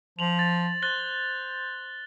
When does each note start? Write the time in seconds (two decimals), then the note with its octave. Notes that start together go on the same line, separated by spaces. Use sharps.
0.19 F3 F7 F#7
0.39 A6
0.82 C5 F#6 A6 G7